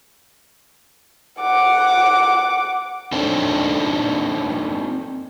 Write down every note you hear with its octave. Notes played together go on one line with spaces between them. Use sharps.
F#5 D6
C4 D4 D#4 A4 C5 D5